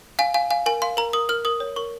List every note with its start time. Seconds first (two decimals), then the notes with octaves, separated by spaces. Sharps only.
0.19 F5 G#5
0.34 F5 G#5
0.50 F5 G#5
0.66 A#4 G#5
0.82 F5 C6
0.97 A#4 A#5
1.13 A#4 D#6
1.29 A#4 F6
1.45 A#4 D#6
1.60 C#5
1.76 A#4 C#6